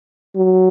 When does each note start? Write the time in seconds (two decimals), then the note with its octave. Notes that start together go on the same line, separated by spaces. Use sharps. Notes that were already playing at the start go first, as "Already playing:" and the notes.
0.36 F#3